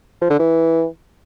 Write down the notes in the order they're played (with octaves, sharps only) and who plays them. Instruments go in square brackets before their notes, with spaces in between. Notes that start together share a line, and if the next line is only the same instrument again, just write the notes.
[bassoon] F3
D3
E3